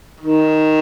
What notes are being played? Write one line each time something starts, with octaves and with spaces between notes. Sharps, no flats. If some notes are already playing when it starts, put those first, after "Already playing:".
D#3